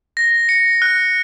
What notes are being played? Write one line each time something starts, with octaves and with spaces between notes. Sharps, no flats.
A#6
C#7
F#6